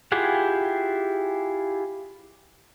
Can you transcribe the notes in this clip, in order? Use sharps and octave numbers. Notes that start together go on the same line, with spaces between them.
E4 F4 G4 G#4 F#5